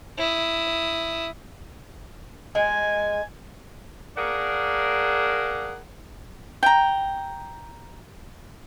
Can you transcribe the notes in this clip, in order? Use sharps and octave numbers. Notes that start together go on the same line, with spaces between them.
E4 D#6
G#3 G#5
A#3 D4 G#4 A#4 F#5
G5 A#5